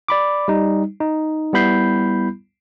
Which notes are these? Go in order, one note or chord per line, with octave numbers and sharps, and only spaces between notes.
D5 B5 D6
G3 D#4
D#4
G3 B3 E4 B5 G6 C7